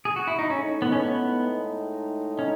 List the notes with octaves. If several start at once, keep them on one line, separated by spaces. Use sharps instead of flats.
G#4
F#4
E4
D#4
A2 G#3 C#4 D#4
B3
C#4
B3
C#4